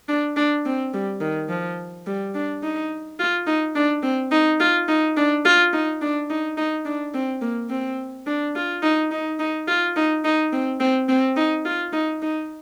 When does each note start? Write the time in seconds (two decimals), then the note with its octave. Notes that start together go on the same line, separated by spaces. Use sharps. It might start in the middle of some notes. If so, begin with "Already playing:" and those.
0.08 D4
0.37 D4
0.66 C4
0.94 G3
1.21 D#3
1.49 F3
2.06 G3
2.35 D4
2.63 D#4
3.19 F4
3.47 D#4
3.75 D4
4.03 C4
4.32 D#4
4.60 F4
4.88 D#4
5.17 D4
5.45 F4
5.73 D#4
6.02 D4
6.30 D#4
6.57 D#4
6.85 D4
7.14 C4
7.41 A#3
7.70 C4
8.27 D4
8.55 F4
8.82 D#4
9.11 D#4
9.40 D#4
9.68 F4
9.96 D#4
10.24 D#4
10.53 C4
10.80 C4
11.09 C4
11.36 D#4
11.65 F4
11.93 D#4
12.22 D#4